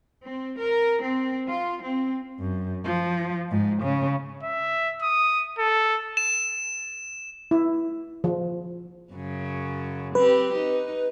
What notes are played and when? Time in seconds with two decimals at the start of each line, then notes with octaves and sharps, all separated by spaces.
0.24 C4
0.58 A#4
1.02 C4
1.48 F4
1.83 C4
2.39 F#2
2.85 F3
3.51 G#2
3.83 C#3
4.43 E5
5.03 D#6
5.58 A4
6.17 E7
7.51 E4
8.24 F3
9.12 F#2 C#3
10.15 C4 G4 B4
10.55 D#4